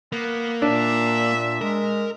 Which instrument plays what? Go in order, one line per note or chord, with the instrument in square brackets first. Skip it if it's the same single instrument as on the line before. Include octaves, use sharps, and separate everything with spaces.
[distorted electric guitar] A#3 [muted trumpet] B3
[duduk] A#2 [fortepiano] D4 [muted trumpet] E5
[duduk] G#3 [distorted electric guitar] A#4